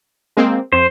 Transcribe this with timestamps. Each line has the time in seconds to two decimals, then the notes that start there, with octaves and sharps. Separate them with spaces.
0.37 G#3 A#3 C4
0.72 F2 C5